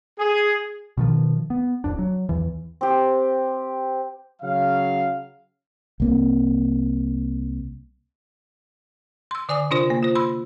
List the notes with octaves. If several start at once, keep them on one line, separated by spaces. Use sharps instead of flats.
G#4
B2 D#3 F3
B3
D1 F2 D4
F#3
E2 E3
C4 G4
C#3 F#3 F5
C2 A#3 C4
C6 E6
D3 D5 G#5 D6 D#6
C3 D4 F4 C5
A#3
F4 C5
B5 C6 E6